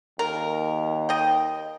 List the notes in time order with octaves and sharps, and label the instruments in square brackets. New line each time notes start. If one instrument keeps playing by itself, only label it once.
[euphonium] D#2 [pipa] A#4
[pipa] D#5 G5